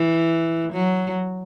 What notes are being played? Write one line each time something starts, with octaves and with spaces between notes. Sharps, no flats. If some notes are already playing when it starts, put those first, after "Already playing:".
Already playing: E3
F#3